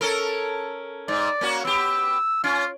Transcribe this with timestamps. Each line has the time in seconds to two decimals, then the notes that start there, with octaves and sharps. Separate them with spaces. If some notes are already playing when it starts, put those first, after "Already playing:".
0.01 C#4 A4 A#4
1.08 G#2 D5
1.41 A#3 C#4 F#4
1.65 B3 G4 E6
2.44 C#4 F4